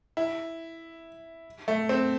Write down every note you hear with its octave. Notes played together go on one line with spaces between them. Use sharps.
E4
A3
C4